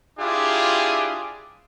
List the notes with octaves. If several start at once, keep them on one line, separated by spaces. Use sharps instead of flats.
D4 E4 F4 G4 G#4